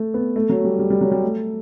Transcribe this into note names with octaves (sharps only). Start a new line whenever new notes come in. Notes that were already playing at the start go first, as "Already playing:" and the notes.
Already playing: A3
B3
A3
F#3
G3
G3
G3
F#3
G3
A3